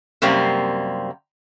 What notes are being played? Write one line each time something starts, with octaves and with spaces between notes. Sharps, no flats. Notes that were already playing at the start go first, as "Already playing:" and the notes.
F#2 C3 G3 A#3 C4